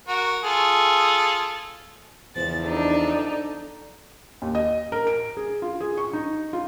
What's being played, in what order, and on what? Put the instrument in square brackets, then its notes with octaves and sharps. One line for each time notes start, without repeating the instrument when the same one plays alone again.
[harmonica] F#4 A#4
F4 G#4 A4
[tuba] E2 [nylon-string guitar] C#3 F3 [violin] A6
[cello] D4 [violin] D#4 A4
[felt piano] D#2
D#5
A#4
D7
G#4
F4
G#4
C#6
D#4
F4